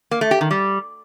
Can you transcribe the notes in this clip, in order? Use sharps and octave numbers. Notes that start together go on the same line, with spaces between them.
A#3
A3
G4
D#3
G3